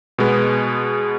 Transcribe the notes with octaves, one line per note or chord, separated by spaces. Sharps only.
B2 G#3 B3